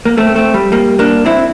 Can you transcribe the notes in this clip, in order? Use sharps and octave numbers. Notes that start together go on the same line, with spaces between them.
A#3
A3 C4
A3 C4
G3
G3 A#3
A#3 D4
C4 E4